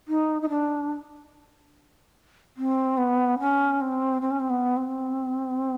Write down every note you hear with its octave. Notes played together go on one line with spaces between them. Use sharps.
D#4
D#4
D4
C4
B3
C#4
C4
C4
C#4
C4
B3
C4